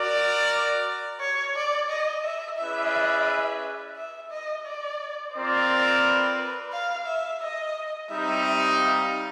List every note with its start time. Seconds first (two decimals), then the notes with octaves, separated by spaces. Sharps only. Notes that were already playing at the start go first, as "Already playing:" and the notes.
Already playing: F#4 A#4 D5
1.20 C#5
1.55 D5
1.89 D#5
2.24 E5
2.58 C#4 E4 G#4 B4 D5 E5
3.96 E5
4.31 D#5
4.66 D5
5.34 C4 F4 A#4 C5 D5
6.03 B4
6.73 F5
7.06 E5
7.41 D#5
8.10 G3 C4 D#4 E5
8.79 F5